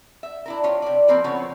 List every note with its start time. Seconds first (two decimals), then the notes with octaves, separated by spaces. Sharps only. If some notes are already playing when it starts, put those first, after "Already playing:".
0.23 E5
0.46 D4 E4 A#4
0.64 F4 G4 C#5
0.82 C3 D5
1.08 F3 A#3 C4 A#4 B4
1.24 C#3 F3 B3 C4 C#5